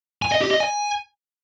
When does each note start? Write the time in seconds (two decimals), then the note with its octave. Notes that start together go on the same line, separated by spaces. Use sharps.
0.22 G#5
0.32 D#5
0.41 G4
0.51 D#5
0.60 G#5